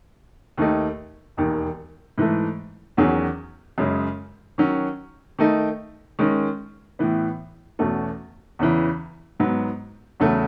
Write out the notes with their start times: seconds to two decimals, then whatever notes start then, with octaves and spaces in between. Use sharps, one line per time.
0.57 D#2 D#3 A3 D#4
1.37 E1 D#2 D#3
2.18 G#2 E3 A3
2.97 E2 D#3 F#3 C#4 G#4
3.78 F#2 C#3 G#3
4.58 D#3 F#3 C#4
5.39 D#3 A3 D#4
6.19 D#3 G#3 C#4
6.99 A2 E3 B3
7.79 E2 B2 A3 C#4
8.59 E2 C#3 E3
9.40 G#2 F#3 B3
10.20 E2 C#3 F#3 A3